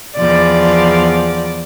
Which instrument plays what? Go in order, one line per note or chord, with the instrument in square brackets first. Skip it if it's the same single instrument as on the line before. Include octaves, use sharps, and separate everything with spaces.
[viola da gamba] E2 F3 D5